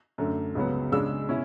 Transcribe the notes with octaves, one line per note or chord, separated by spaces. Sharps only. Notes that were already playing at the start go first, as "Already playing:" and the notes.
F#2 D3 A3
C#2 C#3 F#3 B3
C#3 G#3 D4 E6
B2 C#4 E4